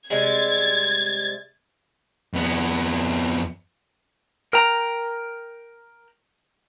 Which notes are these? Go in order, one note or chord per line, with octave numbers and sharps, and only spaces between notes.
C3 G3 G#3 G#6 A6
F2 B3
A#4 G5 A#5